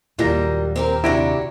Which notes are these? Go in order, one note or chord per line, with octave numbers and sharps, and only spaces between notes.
D#2 A#2 F#3 G3 A#3 F4 A#6
C4 G4 A#4
C3 D4 E4 F#4 G4 A#5 A#6 D7